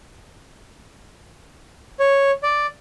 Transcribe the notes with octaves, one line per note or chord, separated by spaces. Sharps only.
C#5
D5